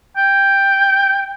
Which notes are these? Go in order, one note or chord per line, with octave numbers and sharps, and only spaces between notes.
G5